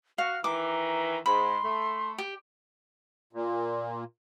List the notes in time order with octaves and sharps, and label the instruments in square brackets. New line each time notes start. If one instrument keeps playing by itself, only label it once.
[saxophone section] F#4 [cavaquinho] F5 [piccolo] F6
[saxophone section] D#3 E3 [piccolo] A#5 [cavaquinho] D6
[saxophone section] G#2 [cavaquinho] B5 [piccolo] C6
[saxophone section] A3
[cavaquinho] G4
[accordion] A#2